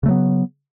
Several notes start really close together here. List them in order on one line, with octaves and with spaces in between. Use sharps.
C#3 A3 F#3 B3